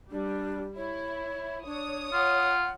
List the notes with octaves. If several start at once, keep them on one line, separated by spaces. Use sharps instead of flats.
G3 D4
E4 C#5
D4 C#5 D#6
F4 F#5